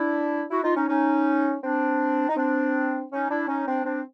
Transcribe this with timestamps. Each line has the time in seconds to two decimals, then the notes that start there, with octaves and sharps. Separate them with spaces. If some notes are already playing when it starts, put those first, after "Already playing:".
Already playing: D4 E4
0.51 E4 F#4
0.64 D#4 F4
0.76 C#4 D#4
0.88 C#4 D#4
1.63 C4 D4
2.29 D#4
2.37 C4 D4
3.11 C#4 D#4
3.30 D4 E4
3.48 C#4 D#4
3.67 C4 D4
3.85 C4 D4